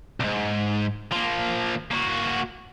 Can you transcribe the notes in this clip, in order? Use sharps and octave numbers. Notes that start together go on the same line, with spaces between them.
C2 G#2
F3 A#3
A#3 F#4